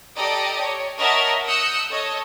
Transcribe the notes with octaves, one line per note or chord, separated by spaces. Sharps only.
G4 A4 D5 D#5 G5 A#5
C#5
A#4 C#5 D#5 E5 F#5 A5
D#6 E6 F#6 G6 C#7
A4 C#5 D#5